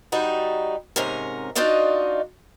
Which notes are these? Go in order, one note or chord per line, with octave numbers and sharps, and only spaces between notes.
G3 D#4 F#4
G#2 C3 C#4 A#4
D4 D#4 F4 F#4 D5 D#5